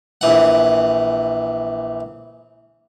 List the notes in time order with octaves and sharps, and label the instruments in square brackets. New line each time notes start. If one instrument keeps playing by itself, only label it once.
[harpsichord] A#1 E3 F#5